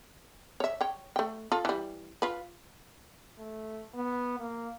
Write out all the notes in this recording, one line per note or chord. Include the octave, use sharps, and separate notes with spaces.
C#5 E5
C#5 G5
A3 G5
F4 A4
E3 G3
F4 B4
A3
B3
A#3